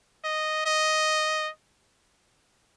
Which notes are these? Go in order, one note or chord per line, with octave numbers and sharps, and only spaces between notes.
D#5
D#5